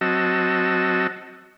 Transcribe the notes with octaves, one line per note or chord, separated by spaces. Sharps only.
F#3 C4 F#4 D#5 A5 E6